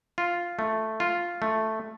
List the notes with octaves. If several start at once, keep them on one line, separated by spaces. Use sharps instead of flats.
F4
A3
F4
A3